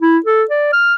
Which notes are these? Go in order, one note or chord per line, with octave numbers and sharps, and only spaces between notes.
E4
A4
D5
F6